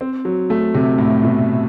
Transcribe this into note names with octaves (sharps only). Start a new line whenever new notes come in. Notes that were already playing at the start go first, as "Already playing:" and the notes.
C4
F#3
A3
C3
A2
B2